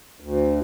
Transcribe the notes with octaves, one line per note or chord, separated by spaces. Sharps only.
D2